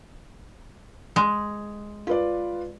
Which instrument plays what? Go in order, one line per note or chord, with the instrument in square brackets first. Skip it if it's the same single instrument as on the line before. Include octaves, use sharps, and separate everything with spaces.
[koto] G#3
[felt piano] F4 B4 D5